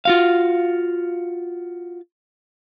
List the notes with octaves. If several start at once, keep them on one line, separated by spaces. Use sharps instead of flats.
F4 F#4 F5